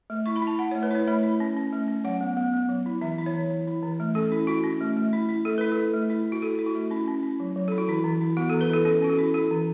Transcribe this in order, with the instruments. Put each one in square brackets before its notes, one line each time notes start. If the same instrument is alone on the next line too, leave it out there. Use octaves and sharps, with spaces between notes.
[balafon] A3
E4 C#6
B5
E4 A5
E4 F#5
C#5
A3
B4
E4 C#5
A3 B5
E4
C#4
C#4
A3
C#4
F#3 F#5
B3
B3
B3
F#3
E4
E3 E5
E4
C#5
E3
E4
E4
E3
A3
C#4 A4
E4
E4 F#4
C#4
A3
A3
E4
E4
A3 A4
E4 B4
A4
E4
A3
E4
E4
F#4
E4 A4
E4
F#4
A3
C#4 E4
C#4
E4
F#3
F#3
E4 A4
F#4
E3 E4
E3
E4
B3 F#4
A4
E3
B4
E4 A4
C#4 A4
C#4 F#4
A4
E4
E4 A4
E3